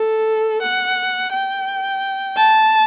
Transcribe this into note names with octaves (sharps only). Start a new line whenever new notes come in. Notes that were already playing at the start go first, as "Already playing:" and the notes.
Already playing: A4
F#5
G5
A5